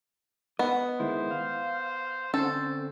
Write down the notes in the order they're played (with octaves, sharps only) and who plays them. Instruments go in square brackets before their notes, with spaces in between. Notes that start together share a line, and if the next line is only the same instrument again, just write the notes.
[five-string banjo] B3 [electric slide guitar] D#5
[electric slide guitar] D#3 G#3 E4 [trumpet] C5
[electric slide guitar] F5
[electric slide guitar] D3 C4 C#4 [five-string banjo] A4 [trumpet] C5